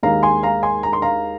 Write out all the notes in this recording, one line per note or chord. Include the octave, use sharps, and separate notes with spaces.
D#2 D#3 G#3 F5 A#5
G#5 C6
F5 A#5
G#5 C6
A#5
C6
F5 A#5